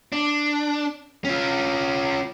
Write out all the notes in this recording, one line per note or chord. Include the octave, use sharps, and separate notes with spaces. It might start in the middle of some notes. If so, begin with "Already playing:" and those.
D4
C#4 F4